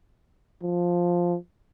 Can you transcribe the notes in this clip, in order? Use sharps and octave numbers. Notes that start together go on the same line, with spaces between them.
F3